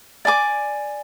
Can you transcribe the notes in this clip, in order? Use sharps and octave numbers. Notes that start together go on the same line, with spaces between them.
D5 G#5 D6